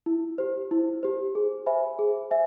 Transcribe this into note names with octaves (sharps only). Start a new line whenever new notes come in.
E4
G4 C5
E4
G4 C5
G#4
C5 E5 G#5 B5
G#4
C5 E5 G#5